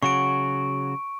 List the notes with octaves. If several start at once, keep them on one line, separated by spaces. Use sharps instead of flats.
C#3 F#3 F#4 C#6 D7